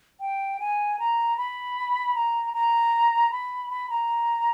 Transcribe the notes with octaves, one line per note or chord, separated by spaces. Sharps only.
G5
G#5
A#5
B5
A#5
A#5
B5
B5
A#5